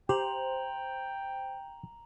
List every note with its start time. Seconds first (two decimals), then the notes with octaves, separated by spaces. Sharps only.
0.09 G4 C5 G5 A#5 F7 F#7